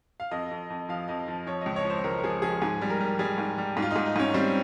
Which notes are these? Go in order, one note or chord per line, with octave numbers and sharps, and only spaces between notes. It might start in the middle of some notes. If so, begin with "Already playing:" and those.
F5
F2 D#5
F2
F2
F3 F5
F2 D#5
F3
F3 C#5
C#2 D#5
C#5
F3
C5
C#2 A#4
F3 G#4
F3 G#4
G#2 G#4
G3
A#4
G3
G3 G#4
G#2
G3
G#2
F4
G#2 D#4
D#4
G#2 C#4
G3 C4